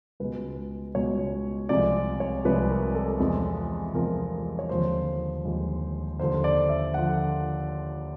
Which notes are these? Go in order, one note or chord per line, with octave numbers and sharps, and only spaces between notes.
C#2 B2 G#3 B4
C#2 B2 G#3 C#5
C2 C3 F3 G#3 D5
C#5
C2 C3 F3 G#3 B4
A#4
A4
E2 C3 F3 G#3
E2 C3 F3 G#3 A#4
C#5
D#2 D3 F3 G#3 C5
D#2 D3 F3 G#3
D#2 D3 F3 C5
D5
E5
D3 F3 F#5